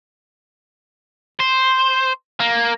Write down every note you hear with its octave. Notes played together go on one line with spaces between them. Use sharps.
C5
A#3